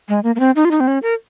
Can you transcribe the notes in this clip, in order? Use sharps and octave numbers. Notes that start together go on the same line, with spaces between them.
G#3
A#3
A#3
C4
D#4
F4
D#4
C4
C#4
A#4